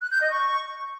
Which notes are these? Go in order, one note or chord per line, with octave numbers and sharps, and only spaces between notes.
F#6
G6
D#5
C#6